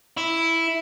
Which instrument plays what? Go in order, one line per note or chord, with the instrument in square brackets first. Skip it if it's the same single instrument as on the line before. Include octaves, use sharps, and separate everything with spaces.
[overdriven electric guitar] E4